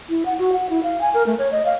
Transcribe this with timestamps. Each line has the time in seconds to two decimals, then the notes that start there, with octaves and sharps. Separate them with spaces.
0.09 E4
0.26 F#5
0.39 F#4
0.52 F#5
0.70 E4
0.83 F5
1.01 G#5
1.14 A#4
1.26 A3
1.38 C#5
1.52 D#5
1.65 F5